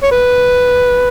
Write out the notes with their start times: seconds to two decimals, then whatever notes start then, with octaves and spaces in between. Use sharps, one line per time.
0.03 C#5
0.11 B4